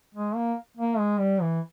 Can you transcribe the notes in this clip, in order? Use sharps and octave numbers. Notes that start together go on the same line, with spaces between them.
G#3
A#3
A#3
G#3
G3
E3